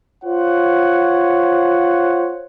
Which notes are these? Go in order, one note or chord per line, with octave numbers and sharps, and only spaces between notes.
F4 C5 C#5 F#5